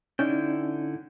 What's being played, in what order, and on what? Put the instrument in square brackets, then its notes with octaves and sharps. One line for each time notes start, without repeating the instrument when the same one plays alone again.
[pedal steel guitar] D3 E4 G5 [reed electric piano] C#4 D#4 D5